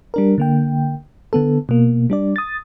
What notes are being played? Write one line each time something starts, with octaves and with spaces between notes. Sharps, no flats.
G3 D4 A#4
D3 A#3 G5
D3 B3 A4
B2 A#3
G3 D4 D5
D#6 A6